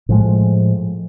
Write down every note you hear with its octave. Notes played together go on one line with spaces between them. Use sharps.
A2 F3 G#3